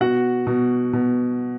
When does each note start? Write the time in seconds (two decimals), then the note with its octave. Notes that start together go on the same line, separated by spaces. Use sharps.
0.01 B2 F#4 F#5
0.47 B2
0.93 B2